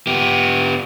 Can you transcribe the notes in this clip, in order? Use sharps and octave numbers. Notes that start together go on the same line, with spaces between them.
B3 G4